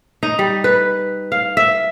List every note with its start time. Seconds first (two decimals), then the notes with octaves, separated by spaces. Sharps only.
0.23 D#4
0.39 G3
0.64 B4
1.32 F5
1.57 E5